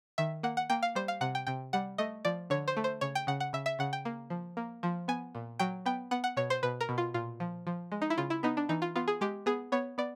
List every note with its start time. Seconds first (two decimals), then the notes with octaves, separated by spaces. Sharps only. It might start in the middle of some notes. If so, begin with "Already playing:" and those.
0.18 D#3 E5
0.43 A#3 F#5
0.57 F#5
0.70 A#3 G5
0.83 F5
0.95 G3 C5
1.08 F5
1.21 C3 F#5
1.35 G5
1.47 C3 G5
1.73 G3 F#5
1.98 A3 D#5
2.25 F3 D5
2.50 D3 C#5
2.68 C5
2.77 A3
2.84 C5
3.01 C#3 C#5
3.15 G5
3.27 C#3 F#5
3.40 F#5
3.53 C#3 E5
3.66 E5
3.79 C#3 F#5
3.93 G5
4.05 A#3
4.30 F3
4.57 A#3
4.83 F3
5.08 B3 G#5
5.35 A#2
5.59 F#3 G5
5.86 B3 G5
6.11 B3 F#5
6.24 F#5
6.37 B2 C#5
6.50 C5
6.63 B2 B4
6.81 A#4
6.89 B2
6.98 F4
7.14 A#2 F4
7.40 F3
7.67 F3
7.92 G#3
8.02 D#4
8.10 E4
8.18 C#3 F4
8.30 E4
8.43 B3 D#4
8.57 D4
8.69 E3 D#4
8.82 F4
8.96 B3 F4
9.08 G#4
9.21 G#3 G4
9.46 B3 G#4
9.72 B3 C#5
9.98 B3 D5